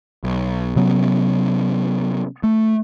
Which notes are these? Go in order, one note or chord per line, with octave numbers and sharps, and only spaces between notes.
B1
C3 F#3 B3 C#4
A3